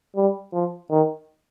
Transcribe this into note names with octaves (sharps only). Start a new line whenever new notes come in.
G3
F3
D#3